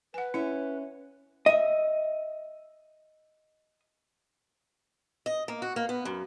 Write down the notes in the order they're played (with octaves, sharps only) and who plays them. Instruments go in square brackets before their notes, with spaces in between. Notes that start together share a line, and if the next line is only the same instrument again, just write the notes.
[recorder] B4 [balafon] F#5 G#5
[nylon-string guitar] C#4 E5 [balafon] E4
[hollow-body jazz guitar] D#5 E5
[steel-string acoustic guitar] D#5
A#3
F#4
A#3
B3
F#2